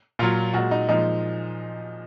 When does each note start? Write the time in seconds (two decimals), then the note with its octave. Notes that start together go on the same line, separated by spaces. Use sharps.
0.19 A#2 F#3 F4
0.54 A#2 G#3 F#4
0.71 D#4
0.88 A#2 F3 G#3 D#4